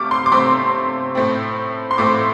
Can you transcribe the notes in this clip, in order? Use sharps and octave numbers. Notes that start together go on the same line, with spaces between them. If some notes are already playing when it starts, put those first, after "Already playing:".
Already playing: C3 A3 D6 F6
C6
D6
C3 A3 C4 C6
A2 A3 C4
C6
A2 A3 C4 D6